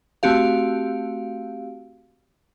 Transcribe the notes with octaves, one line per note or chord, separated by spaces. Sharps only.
A3 C4 F#4 G4 F5